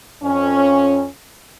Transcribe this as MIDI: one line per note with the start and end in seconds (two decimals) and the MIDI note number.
0.23 1.05 41
0.23 1.05 61